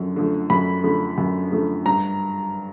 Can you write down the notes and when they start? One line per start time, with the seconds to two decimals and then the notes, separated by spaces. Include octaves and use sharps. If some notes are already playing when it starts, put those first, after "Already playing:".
Already playing: F#2 D3 F3
0.16 D3 F3 A3
0.50 F#2 B5
0.84 D3 F3 A3
1.18 F#2
1.52 D3 F3 A3
1.86 G2 A#5